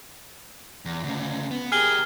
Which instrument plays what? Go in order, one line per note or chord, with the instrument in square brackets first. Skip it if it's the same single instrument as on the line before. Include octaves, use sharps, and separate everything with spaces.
[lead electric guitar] E2
D2 C#3
B3
[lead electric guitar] G4 A#4 [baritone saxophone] G#4 [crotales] F6 G7